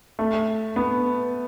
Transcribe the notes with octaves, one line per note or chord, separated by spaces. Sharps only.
A3
B3